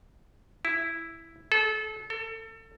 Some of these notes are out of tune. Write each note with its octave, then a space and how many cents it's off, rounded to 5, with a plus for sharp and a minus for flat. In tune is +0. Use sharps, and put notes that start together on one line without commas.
E4 +0
A4 -30
A4 +30